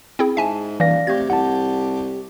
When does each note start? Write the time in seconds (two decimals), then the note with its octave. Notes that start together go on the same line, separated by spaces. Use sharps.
0.19 C4 E4 G#4
0.37 G#2 E5 G#5 A5
0.80 D#1 E3 D5 F5 A#6
1.07 C3 A3 G4 G#6
1.30 C2 F#5 A5